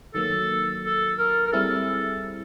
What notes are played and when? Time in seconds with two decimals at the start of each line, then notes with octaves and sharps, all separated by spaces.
0.14 D#3 F#3 A#3 A4
0.84 A4
1.18 A#4
1.46 A#4
1.52 G3 C4 E4 G#4 A4